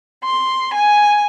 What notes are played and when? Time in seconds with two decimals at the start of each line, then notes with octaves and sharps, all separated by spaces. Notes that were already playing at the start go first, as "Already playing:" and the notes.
0.24 C6
0.74 G#5